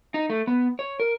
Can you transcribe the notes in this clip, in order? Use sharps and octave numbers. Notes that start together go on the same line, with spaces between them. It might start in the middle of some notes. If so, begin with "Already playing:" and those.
D#4
A3
B3
C#5
A#4